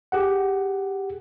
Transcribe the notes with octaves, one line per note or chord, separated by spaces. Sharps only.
G4 G#4 F#5